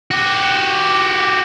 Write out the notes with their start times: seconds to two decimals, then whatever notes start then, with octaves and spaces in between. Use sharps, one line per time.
0.11 F#4 G4